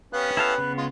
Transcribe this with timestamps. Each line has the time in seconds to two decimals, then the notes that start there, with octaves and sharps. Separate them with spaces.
0.13 B3 C#4 G4 F5 F#6
0.37 E4 A4 B4 F5
0.58 C#3 B3
0.77 G#3 F4